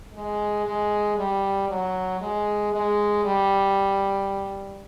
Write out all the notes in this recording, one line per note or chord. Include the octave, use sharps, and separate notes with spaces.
G#3
G#3
G3
F#3
G#3
G#3
G3